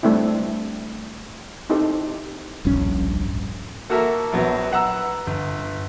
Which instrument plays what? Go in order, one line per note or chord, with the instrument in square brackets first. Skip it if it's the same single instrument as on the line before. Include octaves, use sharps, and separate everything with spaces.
[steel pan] G3 A3 C4 D4 E4
C4 D#4 E4 G4 A4 C5
[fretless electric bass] D1 A#1 G2 C#4
[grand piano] A#3 F#4 A4 A#4 E5 A#5
A#1 F#3 B3
B4 F#5 A#5 E6
G1